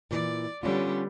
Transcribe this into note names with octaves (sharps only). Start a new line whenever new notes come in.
A#2 E3 D5
D3 G3 B3 C#4 F4